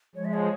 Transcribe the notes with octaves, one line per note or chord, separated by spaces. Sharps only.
F3 G#3 C#5
E5
C#5